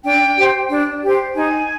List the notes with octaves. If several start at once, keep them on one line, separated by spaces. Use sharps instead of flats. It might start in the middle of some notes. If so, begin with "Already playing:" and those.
D4 G5
G4 C5
D4
G4 C5
D#4 G#5